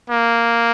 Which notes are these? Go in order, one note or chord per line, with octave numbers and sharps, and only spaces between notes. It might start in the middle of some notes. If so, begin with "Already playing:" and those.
A#3